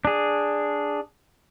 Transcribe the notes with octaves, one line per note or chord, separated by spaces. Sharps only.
D4 G#4